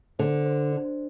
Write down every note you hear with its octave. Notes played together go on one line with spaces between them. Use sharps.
D3 C5
C5
D4